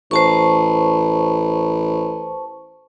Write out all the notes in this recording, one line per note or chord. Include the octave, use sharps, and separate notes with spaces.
A1 C5 A5 C#6